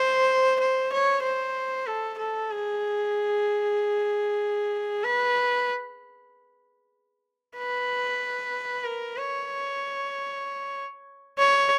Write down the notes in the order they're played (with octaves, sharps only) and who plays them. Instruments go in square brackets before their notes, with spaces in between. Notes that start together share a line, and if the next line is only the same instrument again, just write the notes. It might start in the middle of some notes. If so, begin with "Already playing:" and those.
Already playing: [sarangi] C5
C5
C#5
C5
A4
A4
G#4
B4
B4
A#4
C#5
C#5